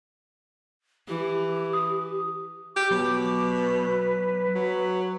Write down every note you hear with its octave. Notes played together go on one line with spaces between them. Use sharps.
E3 G4
D#6
G4 D6
B2 F#3
B4
F#3